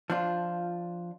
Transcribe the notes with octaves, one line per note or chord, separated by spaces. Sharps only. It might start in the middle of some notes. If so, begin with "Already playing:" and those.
F3 D4 F4